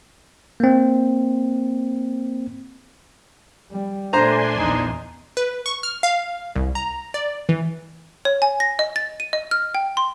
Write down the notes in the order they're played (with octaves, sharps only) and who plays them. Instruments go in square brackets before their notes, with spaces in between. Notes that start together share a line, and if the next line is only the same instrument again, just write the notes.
[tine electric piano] A#3 C4
[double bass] G3
[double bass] A#2 A3 [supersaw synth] D4 G#5 C6 [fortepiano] C5 A#5
[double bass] A#1 E2 [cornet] D#4
[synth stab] B4
C#6
F6
F5
C2
A#5
D5
E3
[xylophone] C#5
G#5
A#6
D#5
A6
D#7
D#5
F6
G5
C6